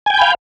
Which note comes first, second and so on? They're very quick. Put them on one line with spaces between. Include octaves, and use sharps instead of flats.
G#5 G5 G6 B5 F5